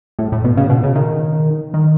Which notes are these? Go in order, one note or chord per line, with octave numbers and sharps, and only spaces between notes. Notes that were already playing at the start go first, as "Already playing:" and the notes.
A2
A2
B2
C#3
B2
C#3
D#3
D#3